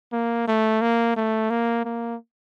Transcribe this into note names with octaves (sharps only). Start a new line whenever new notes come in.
A#3
A3
A#3
A3
A#3
A#3